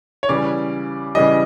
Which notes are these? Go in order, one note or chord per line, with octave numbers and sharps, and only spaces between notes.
C#5
C#3 E3 G3 D5
C#3 E3 G3 D#5